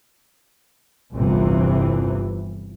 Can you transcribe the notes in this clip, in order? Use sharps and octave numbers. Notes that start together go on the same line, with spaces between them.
G1 C2 F2 C3 E3